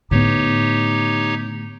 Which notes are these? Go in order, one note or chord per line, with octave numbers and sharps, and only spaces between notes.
A2 D3 B3 D#4 G4 C#5